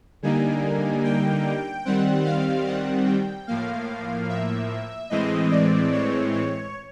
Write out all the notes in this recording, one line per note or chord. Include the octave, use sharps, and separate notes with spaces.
D3 G3 A#3 D#4 G#5
G5
D#3 G3 C4 F#5
F5
F#5
G5
A2 F3 A#3 F5
E5
A2 E3 G#3 C4 D#5
D5
C#5
C#5